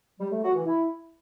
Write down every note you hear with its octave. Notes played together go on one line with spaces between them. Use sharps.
G3
A3
F#4
E3
E4